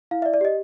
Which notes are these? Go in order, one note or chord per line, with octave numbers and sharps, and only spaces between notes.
E4 F5
D5 E5
D5
G4 D#5